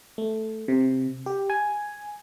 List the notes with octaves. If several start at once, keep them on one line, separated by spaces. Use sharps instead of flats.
A3
C3
G4
G#5